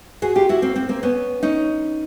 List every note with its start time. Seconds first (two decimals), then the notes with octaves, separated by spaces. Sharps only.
0.22 F#4 G#4
0.35 F4 G4
0.49 E4 F#4
0.62 A#3 C4
0.76 A#3 C4
0.89 A#3 C4
1.03 B3 C#4
1.43 C#4 D#4